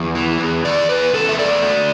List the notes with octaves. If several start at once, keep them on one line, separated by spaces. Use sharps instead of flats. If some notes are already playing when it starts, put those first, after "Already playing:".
Already playing: E2
E3
E2
E2 D5
E2 B4
E2 A4
E5
A3 D5
A3